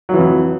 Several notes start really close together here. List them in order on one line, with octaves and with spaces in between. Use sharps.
F#3 E3 F2